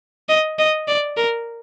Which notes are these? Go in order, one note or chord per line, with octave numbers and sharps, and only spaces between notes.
D#5
D#5
D5
A#4